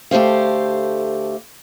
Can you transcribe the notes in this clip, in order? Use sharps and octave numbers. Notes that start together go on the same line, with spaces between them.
D2 A3 G4 C5 F5